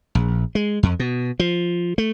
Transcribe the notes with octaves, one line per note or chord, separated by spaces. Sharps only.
A#1
G#3
F2
B2
F3
A3